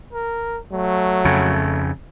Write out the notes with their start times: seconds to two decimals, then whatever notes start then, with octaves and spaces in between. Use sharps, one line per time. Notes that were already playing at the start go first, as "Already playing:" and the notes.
0.13 A#4
0.72 F#3 A3
1.25 F2 C#3